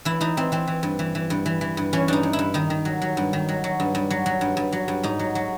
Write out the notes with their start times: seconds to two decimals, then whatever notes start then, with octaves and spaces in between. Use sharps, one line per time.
0.05 E3 E4
0.21 E3 D#4
0.37 E3 C4
0.52 E3 C4
0.68 E3
0.83 G2
0.99 E3
1.15 E3
1.30 G2
1.46 E3
1.61 E3
1.77 G2
1.93 E3 C#4
2.08 G2 D4 D#4
2.23 G2
2.33 E4
2.39 G2
2.54 D#3 D#4
2.70 D#3
2.85 F#3
3.02 F#3
3.17 G2
3.33 D#3
3.49 F#3
3.64 F#3
3.80 G2
3.95 G2
4.10 F#3
4.26 F#3
4.41 G2
4.57 G2
4.72 F#3
4.88 G2
5.03 G#2 D#4
5.19 F#3
5.35 F#3